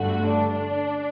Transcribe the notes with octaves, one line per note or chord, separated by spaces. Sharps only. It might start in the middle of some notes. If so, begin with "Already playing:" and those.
Already playing: G1 G2 D3 A3 F#4
D4